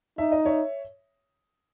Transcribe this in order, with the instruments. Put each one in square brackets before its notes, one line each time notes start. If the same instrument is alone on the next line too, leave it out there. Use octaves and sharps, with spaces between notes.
[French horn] D#4 [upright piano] E5
[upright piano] D#5
C#5 E5